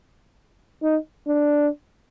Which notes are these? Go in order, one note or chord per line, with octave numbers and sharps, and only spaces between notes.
D#4
D4